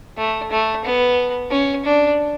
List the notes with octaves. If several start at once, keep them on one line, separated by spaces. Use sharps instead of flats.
A3
A3
B3
C#4
D4